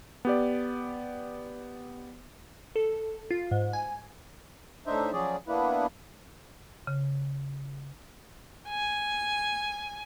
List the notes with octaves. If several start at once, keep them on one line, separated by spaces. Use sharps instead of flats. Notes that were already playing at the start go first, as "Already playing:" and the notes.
B3 G4 D5
A4
F4
G#2
G#5
A2 D4 D#4 C5 E5
F3 F#3 C#4 G#4 D5
A#3 B3 D4 E4 B4
C#3
G#5